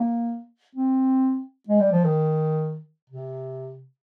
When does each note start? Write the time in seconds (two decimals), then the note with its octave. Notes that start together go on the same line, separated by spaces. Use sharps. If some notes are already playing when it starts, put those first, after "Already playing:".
Already playing: A#3
0.75 C4
1.69 G#3
1.81 G3
1.93 F3
2.04 D#3
3.10 C3